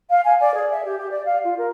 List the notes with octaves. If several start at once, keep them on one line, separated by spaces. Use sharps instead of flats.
F5
G#5
D5
G#4
E5
G4
G4
D5
F5
F4
A#4